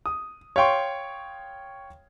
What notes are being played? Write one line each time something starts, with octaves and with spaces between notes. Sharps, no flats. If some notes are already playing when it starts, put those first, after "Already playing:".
D#6
C#5 F5 G5 C6 C#6